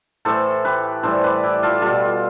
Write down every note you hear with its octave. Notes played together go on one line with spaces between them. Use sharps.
A2 E3 A3 A4 C5
G4 B4
A2 E3 G3 A4 C5
B4 D5
E4 G4
F4 A4
B2 G3 F4 A4